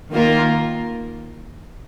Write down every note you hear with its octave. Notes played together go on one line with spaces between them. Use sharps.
D#3 A#3 F4 A#4